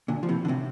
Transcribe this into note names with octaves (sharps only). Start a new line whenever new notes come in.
A#2 D3
F3
C3 E3
D3
A2 C3